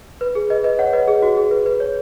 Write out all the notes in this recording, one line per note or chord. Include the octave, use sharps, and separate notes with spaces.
B4
G#4
B4 D#5
B4 D#5
C#5 F#5
B4 D#5
G#4
F#4
G#4
B4
B4
C#5